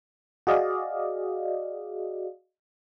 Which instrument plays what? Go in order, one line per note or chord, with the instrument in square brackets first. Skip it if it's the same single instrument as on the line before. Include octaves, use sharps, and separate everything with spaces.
[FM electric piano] F#4 G#4 D5 D#5 F5